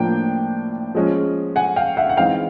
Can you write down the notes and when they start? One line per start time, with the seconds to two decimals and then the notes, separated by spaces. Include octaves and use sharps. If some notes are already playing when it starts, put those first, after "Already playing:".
Already playing: A2 F3 A#3 D4 G5
0.95 F3 G#3 C#4
1.56 F#5 G#5
1.76 F5 G5
1.97 E5 F#5
2.10 F#5
2.17 E3 G#3 C4 D#4 F5 G5